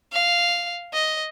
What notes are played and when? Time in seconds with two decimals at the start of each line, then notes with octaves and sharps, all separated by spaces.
0.12 F5
0.93 D#5